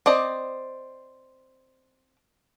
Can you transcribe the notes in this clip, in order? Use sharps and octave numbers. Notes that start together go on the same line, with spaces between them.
C4 D5 D#5